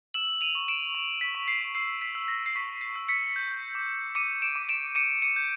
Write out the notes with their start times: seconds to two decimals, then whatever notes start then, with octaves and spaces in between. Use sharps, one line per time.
0.14 E6 E7 F#7
0.41 D#7 F7
0.55 C#6
0.68 D7 E7
0.95 C#6
1.21 B6
1.35 C#6
1.48 C7
1.75 E6 C7
2.02 B6
2.15 E6
2.28 A#6
2.46 C7
2.55 C#6 B6
2.81 C7
2.96 E6
3.09 B6 C#7
3.36 G6
3.75 D6
4.15 D6 C#7 D#7
4.42 D7 E7
4.56 D6
4.69 D7 E7
4.95 D6 C#7 D#7
5.22 C#7 D#7
5.36 G6